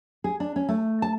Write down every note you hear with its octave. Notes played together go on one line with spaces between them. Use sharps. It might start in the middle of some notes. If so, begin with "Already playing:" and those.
G#4
D4
C#4
A3
A5